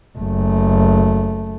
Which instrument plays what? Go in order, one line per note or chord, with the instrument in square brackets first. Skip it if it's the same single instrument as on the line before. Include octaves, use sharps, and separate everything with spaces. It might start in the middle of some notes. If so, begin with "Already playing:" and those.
[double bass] F#1 A3